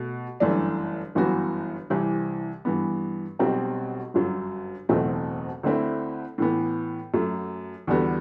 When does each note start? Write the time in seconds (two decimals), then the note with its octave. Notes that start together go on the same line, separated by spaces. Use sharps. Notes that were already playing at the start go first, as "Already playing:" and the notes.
Already playing: B2 A3 F#4
0.40 G1 F#2 E3 A3 D4
1.15 G1 F#2 E3 B3 F#4
1.90 C2 C3 E3
2.65 G2 E3 B3
3.39 B1 B2 G3 C4 G4
4.14 G1 F#2 F#3
4.89 F#1 E2 B2 A3 C4
5.63 D2 D3 A3 C4 E4
6.38 A2 E3 B3
7.14 F#2 F#3 A3
7.87 E2 D3 G3 B3 F#4